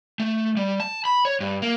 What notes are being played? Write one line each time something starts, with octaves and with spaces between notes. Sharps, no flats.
A3
G3
A5
B5
C#5
G2
A#3